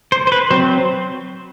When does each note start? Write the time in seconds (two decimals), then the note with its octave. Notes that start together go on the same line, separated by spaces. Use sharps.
0.12 C5
0.27 C5
0.32 B4
0.51 F#3 C4 C5